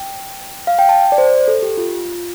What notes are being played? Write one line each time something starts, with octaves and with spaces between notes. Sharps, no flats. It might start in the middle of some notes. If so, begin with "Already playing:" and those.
Already playing: G5
F5
G5
A5
D5
C5
A4
G4
F4